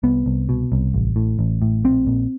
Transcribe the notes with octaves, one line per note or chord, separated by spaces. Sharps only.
C2 B3
C2
B2
C2
A1
A2
A1
A2
A#1 C4
A#2